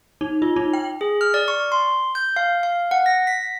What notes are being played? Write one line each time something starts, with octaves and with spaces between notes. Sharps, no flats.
D#4
F4
D#4
G5
G#4
F6
D5
C#6
C6
G6
F5
F5
F#5
A#6
B6